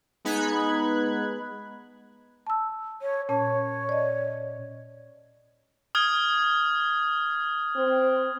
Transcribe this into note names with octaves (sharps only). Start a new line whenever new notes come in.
G#3 B3 D#4 B5 F#6 G#6
A5 E6
C#5
A#2 C#4 C#5 A5
D5 D#5
D#6 F6 G#6
C4